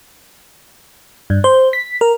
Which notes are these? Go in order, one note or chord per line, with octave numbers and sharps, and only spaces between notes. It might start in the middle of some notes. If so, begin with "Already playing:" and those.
G2
C5
B6
A#4